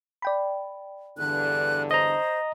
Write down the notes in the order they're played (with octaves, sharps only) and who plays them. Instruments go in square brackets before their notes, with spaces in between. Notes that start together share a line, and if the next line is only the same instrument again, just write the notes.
[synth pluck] D5 G5 B5
[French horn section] E2 G2 D3 [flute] F#6
[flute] C5 [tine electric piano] D#5 A#5